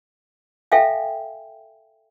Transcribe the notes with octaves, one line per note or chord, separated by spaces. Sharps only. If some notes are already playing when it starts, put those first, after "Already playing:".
A4 E5 F5 G5 G#5